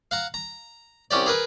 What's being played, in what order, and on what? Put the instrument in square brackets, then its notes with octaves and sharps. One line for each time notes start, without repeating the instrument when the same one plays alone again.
[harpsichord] F5 F#5 A#5
A#5
C2 C#4 G4 D5
G#4 A#4 B4